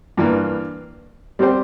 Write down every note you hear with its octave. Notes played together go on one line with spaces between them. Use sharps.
G2 E3 A#3
G3 C4 G4 C5